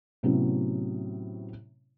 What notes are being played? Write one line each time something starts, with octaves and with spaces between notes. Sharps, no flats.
A2 C3 F#3 B3 C#4 E4